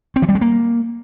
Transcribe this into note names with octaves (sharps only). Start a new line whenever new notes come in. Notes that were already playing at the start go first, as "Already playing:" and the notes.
C4
E3
G3
G#3
A#3